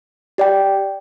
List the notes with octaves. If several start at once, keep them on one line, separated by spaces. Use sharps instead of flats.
G4 D5 G5